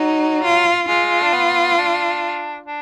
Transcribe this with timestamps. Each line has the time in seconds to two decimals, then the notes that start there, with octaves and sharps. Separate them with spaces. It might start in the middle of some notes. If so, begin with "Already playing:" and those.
Already playing: F#3 D#4
0.44 F4
0.88 G#3 F4
1.22 D4
1.33 B3
1.78 D4
2.66 D4